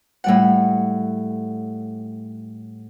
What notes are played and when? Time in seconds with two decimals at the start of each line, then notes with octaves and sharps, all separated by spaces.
0.24 A2 G3 F#5